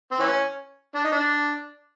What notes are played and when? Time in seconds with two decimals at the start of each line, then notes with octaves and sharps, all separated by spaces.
0.11 C4
0.20 E3 C#4
0.95 D4
1.04 D#4
1.12 D4